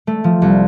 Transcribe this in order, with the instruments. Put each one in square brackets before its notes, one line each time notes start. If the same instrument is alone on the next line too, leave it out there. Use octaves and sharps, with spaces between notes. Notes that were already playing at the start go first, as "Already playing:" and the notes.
[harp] A3
F3
C2